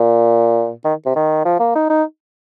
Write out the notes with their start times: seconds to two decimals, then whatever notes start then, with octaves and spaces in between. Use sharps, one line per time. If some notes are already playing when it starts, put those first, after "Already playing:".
Already playing: A#2
0.85 D#3
1.06 C3
1.16 D#3
1.45 F3
1.60 A#3
1.75 D#4
1.90 D#4